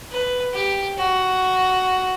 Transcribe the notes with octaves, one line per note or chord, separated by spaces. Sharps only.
B4
G4
F#4